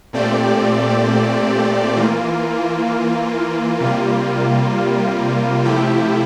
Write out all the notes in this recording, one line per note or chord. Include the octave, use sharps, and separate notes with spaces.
A#2 A3 C4 G4 D5
E3 A#3 F4
C3 G3 A#3 F4
C3 F3 A3 E4 G4